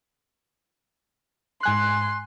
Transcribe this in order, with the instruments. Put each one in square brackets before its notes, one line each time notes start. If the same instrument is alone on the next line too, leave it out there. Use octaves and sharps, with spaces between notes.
[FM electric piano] G#2 G#5 F#6 [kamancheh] C6